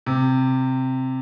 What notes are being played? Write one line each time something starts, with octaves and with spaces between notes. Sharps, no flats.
C3